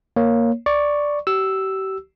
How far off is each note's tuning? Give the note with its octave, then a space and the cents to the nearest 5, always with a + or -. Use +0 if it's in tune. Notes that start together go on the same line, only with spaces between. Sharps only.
A#3 +0 C#5 +0
D5 +0 C#6 +0
G4 -35 E6 +0